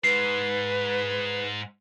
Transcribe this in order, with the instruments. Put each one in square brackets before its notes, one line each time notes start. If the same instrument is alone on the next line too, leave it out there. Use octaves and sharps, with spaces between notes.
[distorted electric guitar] G#2 [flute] B4 [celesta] C7